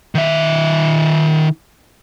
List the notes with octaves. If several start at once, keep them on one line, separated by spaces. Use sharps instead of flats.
D#3 E5